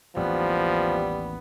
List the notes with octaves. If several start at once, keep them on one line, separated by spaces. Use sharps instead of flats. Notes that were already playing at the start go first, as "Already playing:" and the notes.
A1 D#2 F3 G3 B3